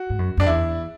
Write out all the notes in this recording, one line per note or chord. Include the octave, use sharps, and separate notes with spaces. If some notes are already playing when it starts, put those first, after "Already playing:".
Already playing: F#4
G#2
F#2
F#2 D4
E2 E4